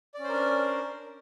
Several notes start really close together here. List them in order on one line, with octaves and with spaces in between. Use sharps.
D5 C#4 C5 A#4 D4